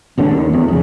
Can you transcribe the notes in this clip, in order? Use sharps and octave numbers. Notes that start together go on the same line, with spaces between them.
D#1 A1 D3 C#4
D#2
E2
D1 F2 C#3